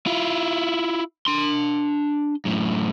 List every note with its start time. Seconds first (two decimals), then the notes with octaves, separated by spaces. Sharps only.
0.06 E4 F4
1.26 D4 C6
2.45 F#2 A2